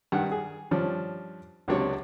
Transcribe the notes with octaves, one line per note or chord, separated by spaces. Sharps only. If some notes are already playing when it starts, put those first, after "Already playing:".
G2 D#3 F#5
G#4
G2 F3 C#4 D4
C#2 C3 F#3 C4 D4 C#5